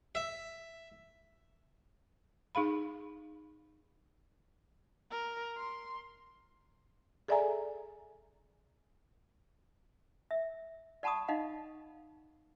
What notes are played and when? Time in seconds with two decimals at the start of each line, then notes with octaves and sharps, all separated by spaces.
0.15 E5
2.55 D#4 G#4 F5 B5
5.11 A#4
5.58 C6
7.28 G#4 A4 D5 E5 G#5 A#5
10.31 E5
11.03 D5 F#5 A5 B5 C#6 D#6
11.28 D#4 D#5 F5 F#5